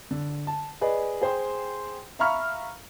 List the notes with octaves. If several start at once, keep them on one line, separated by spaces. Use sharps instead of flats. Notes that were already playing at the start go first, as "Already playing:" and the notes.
D3
A5
G#4 B4 D5 D#5
G#4 C5 G5 C6
E5 F5 A#5 B5 C#6 F6